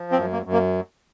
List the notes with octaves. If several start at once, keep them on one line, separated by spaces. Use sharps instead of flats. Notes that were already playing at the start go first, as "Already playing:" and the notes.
Already playing: F3
C4
F#2
A#3
F#2
A#3